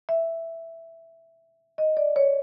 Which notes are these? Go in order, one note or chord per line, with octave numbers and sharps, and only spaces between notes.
E5
D#5
D5
C#5